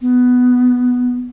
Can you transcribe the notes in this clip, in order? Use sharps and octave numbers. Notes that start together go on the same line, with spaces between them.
B3